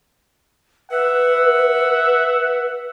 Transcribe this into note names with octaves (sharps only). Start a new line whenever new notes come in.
B4 E5 F#5